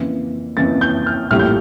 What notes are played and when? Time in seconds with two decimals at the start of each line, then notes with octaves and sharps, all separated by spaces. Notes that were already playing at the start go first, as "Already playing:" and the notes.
Already playing: F2 C#3 E3 A#3
0.57 F2 C#3 E3 A#3 A6
0.81 G6
1.06 F6
1.31 A#1 A2 G3 A#3 F6
1.39 G6